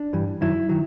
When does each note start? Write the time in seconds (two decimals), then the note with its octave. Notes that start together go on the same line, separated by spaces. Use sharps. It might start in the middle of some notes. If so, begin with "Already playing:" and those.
Already playing: D4
0.13 G2 E3 G3
0.41 F#2 D#3 F#3 E4
0.69 D#3 F#3